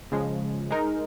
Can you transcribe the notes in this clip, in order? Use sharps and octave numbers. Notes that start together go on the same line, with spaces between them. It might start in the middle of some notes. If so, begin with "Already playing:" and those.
C#3 F3 G#3
G#3 D#4 A#4